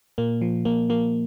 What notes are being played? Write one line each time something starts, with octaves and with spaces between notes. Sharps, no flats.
A#2 A#3
F3
A#2 A#3
F3 A#3